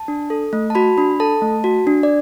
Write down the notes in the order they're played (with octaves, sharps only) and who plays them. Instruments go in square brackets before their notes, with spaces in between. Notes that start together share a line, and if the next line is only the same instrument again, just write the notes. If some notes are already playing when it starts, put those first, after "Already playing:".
Already playing: [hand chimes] A5
D4
A4
A3
A5
F#4 B5
D4 B5
A4 A5
A3
F#4
D4
D5